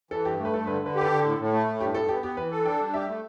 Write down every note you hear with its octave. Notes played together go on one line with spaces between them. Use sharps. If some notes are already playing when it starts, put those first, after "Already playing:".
E3 A4
G2 G4
A3 B4
G2 A4
D3 B4
D3 B4
G4
B4
D3 A4
A2
A2
A3
A2
G2 G4
G2 A4
B3 G4
B3 G4
E3 B4
A4
D4 G5
G3
G4 E5
A3